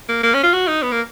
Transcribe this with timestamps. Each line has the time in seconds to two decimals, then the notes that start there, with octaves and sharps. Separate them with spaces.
0.09 A#3
0.23 A#3
0.34 C#4
0.43 F4
0.53 F#4
0.68 D#4
0.83 B3
0.92 A#3